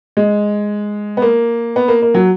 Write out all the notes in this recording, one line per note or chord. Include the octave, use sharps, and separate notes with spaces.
G#3
B3
A#3
B3
A#3
A#3
F#3